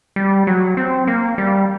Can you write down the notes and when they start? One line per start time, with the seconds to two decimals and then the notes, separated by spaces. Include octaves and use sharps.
0.16 G3
0.47 F#3
0.77 C4
1.07 A#3
1.38 G3